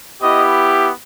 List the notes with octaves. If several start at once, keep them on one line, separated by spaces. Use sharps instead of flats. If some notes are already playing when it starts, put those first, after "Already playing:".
B3 E4 G4 D#5